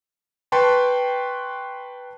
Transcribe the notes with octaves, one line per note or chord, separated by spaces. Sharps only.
B4 G5 A5 C6 C#6